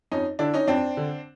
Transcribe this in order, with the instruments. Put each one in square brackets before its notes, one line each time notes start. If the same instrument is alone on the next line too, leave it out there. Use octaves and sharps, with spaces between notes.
[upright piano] F2 C#4 D#4
D3 D4 E4
C#4 D#4
F2 C4 D4
D3